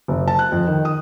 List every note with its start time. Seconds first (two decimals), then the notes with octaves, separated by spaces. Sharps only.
0.08 F#1
0.28 A5
0.39 F#6
0.52 F2
0.67 D#3
0.85 D#6